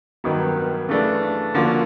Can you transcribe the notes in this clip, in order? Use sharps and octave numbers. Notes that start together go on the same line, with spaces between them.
G2 D#3 F#3 B3
C#3 E3 A3 D4
D3 F3 A#3 C#4 F#4